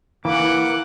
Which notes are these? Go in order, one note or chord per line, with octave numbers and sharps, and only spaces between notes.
E3 A#3 F#5 D6